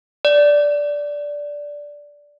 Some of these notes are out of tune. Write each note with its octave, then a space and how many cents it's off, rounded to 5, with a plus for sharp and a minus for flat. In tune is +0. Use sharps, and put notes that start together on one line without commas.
D5 -10